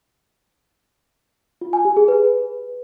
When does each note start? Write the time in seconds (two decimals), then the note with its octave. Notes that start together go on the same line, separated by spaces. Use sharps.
1.61 F4
1.73 G#5
1.85 G4
1.97 G#4
2.08 B4